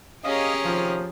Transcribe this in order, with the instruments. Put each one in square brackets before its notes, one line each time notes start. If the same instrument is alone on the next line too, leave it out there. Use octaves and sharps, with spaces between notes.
[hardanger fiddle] C#4 A#4 [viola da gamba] G4 G#4 C#5 [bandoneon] D#5 F5 D#6
[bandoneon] C3 D#3 [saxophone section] F3